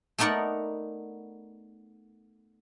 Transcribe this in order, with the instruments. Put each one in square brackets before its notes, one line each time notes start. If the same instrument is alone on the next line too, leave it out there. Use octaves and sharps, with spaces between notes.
[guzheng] A3 B3 D#4 A#4 D5 F#5